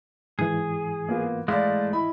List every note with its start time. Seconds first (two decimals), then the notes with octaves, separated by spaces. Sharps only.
0.39 G#2 E3 G#4
1.09 A#3 B3 F4
1.48 G#3 A3 E4 D5 F5
1.93 E4 D#5 B5